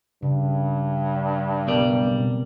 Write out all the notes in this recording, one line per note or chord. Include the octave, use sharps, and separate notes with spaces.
G2 C#3
B1 G3 B3 A#4 D5
B2 C4